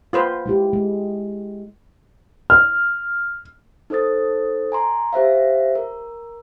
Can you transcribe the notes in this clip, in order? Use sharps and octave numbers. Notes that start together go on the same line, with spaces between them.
F4 B4 C5
G#3 E4 G4
G#3
F6
D#4 A4 C5 D#6 A6
G#5 A#5 C6
G4 C5 E5 F5
A#4